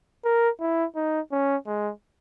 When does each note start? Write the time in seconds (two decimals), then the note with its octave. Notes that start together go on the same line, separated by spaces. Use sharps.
0.25 A#4
0.60 E4
0.96 D#4
1.32 C#4
1.67 G#3